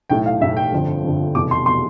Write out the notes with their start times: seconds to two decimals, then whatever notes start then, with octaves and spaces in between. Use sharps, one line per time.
0.10 B1 A2 E3 G5
0.26 F5
0.41 B1 A2 E3 E5
0.57 G5
0.72 G1 F2 D3 F3
1.03 G1 F2 D3 F3
1.35 F1 E2 B2 D6
1.51 C6
1.66 B2 C6